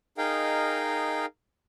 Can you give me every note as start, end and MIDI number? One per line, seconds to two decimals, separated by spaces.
0.18 1.26 63
0.18 1.26 68
0.18 1.26 70
0.18 1.26 75
0.18 1.26 77
0.18 1.26 79